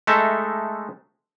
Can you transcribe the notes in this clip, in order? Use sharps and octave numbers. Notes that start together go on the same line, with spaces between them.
G#3 A3 D#4 A4 E5